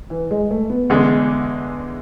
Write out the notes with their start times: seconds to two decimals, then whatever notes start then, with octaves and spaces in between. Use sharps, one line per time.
0.10 E3
0.31 G#3
0.51 A3
0.70 B3
0.90 E2 D3 G#3